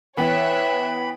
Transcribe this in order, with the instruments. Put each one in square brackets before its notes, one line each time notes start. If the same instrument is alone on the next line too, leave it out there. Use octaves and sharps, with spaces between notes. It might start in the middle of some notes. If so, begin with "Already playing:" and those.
[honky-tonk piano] E3 B3 [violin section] C#5 E5 F#6 [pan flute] G5 [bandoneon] B5